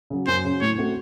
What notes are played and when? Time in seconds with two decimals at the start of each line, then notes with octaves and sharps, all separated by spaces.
0.10 C#3 F#3
0.27 F#2 C5
0.45 C#3 F#3
0.61 A2 C#5
0.77 A3 C4 F#4